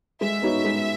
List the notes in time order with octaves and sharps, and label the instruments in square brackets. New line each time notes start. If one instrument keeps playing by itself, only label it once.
[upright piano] G#3 [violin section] E5
[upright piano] B3 D#4 F#4 C#5
G#3